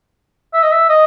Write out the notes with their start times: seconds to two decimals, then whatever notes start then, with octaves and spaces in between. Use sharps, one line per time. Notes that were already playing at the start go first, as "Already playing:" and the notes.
0.54 E5
0.63 D#5
0.72 E5
0.89 D#5